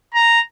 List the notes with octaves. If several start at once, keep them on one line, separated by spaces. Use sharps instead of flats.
A#5